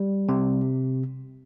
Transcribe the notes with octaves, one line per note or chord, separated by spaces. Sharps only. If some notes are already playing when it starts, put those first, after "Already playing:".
Already playing: G3
C3